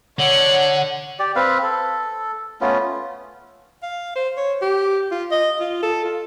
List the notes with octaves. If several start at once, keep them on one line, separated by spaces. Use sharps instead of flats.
D3 C#5 F#5 F#7
G4 D5
C4 B4 F5
A4
A3 B3 C#4 F4
F5
C5
C#5
G4
F4
D#5
F4
A4
F4